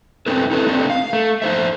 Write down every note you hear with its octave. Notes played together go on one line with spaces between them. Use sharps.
C4 C#4 D#4 A4 B4
D#4 E4 A4 B4 C#5
A3 C4 D4 D#4
F5
A3
D#4 C5 E5